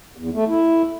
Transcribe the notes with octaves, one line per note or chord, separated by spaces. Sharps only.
E2
A3
E4